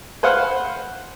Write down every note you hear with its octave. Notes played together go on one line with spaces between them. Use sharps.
B4 C5 F5 F#5